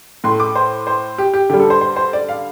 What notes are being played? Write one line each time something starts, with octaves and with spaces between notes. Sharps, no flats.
A2 A3 C6
D6
C5
C5
G4
G4
D3 G3 G4
A4
C5
C5
C5
D5
F5